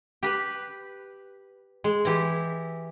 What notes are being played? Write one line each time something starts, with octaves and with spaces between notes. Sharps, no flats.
G4 B4
G#3
E3 E4 G4